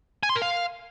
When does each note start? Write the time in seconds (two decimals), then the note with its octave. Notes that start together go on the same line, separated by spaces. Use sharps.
0.23 G#5
0.29 C6
0.36 A#4
0.42 F5